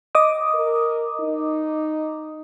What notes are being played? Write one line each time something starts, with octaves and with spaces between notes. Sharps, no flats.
D#5 D6 D#6
A#4
D#4